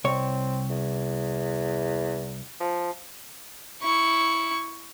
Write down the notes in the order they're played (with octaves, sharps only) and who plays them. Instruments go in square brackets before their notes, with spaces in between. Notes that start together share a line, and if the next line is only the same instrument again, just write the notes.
[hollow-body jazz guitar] C2 C#5 [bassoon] C4
[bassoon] E2
F3
[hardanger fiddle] E4 C#6